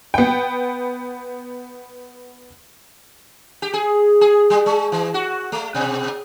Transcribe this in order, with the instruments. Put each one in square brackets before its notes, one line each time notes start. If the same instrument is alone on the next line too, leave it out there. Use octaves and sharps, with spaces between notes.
[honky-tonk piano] B3 G5
[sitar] G4
G#4
G#4
G3
G#3
E3
F#4
A3
B2